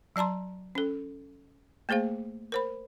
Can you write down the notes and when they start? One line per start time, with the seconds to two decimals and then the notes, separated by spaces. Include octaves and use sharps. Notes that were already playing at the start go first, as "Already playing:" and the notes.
0.16 F#3 D5 A5 A#5 C6
0.75 C#4 A4
1.89 A3 A#3 G#4 C5 F5
2.52 A#4 C5 B5